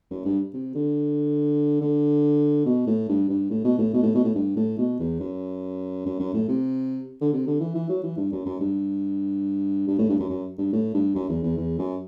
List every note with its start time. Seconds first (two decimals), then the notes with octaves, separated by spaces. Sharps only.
0.11 F#2
0.25 G2
0.53 C3
0.75 D3
1.81 D3
2.65 B2
2.87 A2
3.08 G2
3.29 G2
3.50 A2
3.64 B2
3.78 A2
3.93 B2
4.03 A2
4.15 B2
4.24 A2
4.35 G2
4.56 A2
4.78 B2
5.00 E2
5.20 F#2
6.06 F#2
6.19 F#2
6.34 A2
6.48 C3
7.21 D3
7.33 C3
7.47 D3
7.60 E3
7.75 E3
7.89 F#3
8.03 E3
8.17 G2
8.32 F#2
8.45 F#2
8.60 G2
9.88 G2
9.98 A2
10.09 G2
10.19 F#2
10.30 F#2
10.58 G2
10.72 A2
10.94 G2
11.15 F#2
11.29 E2
11.43 E2
11.57 E2
11.79 F#2